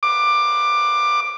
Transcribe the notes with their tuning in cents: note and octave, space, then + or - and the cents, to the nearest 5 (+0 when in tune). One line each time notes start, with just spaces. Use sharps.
D6 +15